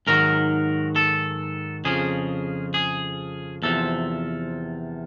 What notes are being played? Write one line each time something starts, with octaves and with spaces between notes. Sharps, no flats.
G#2 D#3 F#3 A#4
A4
F2 C#3 F3 G#4
G#4
E2 C3 F3 A4